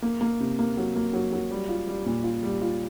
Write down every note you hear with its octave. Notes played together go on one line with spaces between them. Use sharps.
A#3
A#3
C3
A#3
F#3
A#3
F#3
F#3
G3
F4
G3
A#2
F4
G3
F4